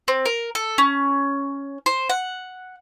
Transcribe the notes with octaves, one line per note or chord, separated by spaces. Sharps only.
C4
A#4
A4
C#4
C5
F#5